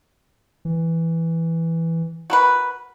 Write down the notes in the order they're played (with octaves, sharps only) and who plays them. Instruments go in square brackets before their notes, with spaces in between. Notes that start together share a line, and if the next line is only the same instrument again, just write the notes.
[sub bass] E3
[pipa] F#4 A#4 B4